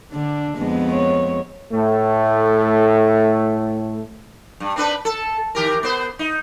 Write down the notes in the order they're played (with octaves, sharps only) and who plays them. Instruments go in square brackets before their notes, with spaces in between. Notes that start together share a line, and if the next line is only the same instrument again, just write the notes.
[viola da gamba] D3 [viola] D4
[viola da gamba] F2 G#3 B3
[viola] C#5
[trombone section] A2 A3
[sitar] G2
C4 D4 B4
A4
D#3 G4 A#4
B3 C5
D#4